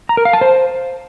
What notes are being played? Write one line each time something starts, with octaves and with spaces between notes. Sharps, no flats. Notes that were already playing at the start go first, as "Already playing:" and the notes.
A#5
A#4
F5
A5
C5